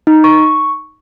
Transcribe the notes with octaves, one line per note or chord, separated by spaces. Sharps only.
D#4
C#6